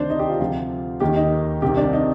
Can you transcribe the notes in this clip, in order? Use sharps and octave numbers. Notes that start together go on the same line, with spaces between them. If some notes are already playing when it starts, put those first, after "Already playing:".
Already playing: D2 C3 D#3 D4 C5
D#4
G4
F4
D2 C3 F3
D#2 D#3 G4
D#4
C2 C3 D#3 G4
D4
D#4